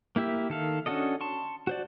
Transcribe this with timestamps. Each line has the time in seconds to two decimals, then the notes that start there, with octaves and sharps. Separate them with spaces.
0.16 A#3 E4 G4 E5
0.50 D#3 A4 F5
0.86 C#4 D4 F#4 A4 D#5
1.21 A5 C6 C#6
1.67 F#4 C5 D5